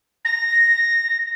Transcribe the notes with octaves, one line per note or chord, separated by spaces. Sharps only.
A#6